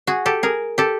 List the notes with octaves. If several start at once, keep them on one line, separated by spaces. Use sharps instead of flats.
F#4 G#4
G4 A4
G#4 A#4
G4 A4